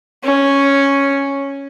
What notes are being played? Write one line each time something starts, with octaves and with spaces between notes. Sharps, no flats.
C#4